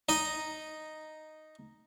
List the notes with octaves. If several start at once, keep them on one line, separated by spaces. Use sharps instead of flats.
D#4 D#5